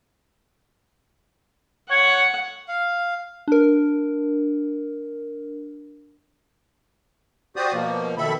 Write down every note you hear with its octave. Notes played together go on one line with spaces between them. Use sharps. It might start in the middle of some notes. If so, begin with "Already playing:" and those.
C#5 F#5
F5
D4 A#4
F#4 G4 C5 D5 D#6
B2 F3 A#3
B2 D#3 A4 E5 B5